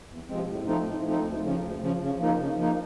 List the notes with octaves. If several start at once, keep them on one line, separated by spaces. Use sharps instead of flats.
E2
C3 F3 G#3 C4
A2
F3 A3 C4 D#4
A2
F3 A3 C4 D#4
D2
C#3 F3
D2
C#3 F3
C#3
F3 A#3 D#4
C#3
F3 A#3 D#4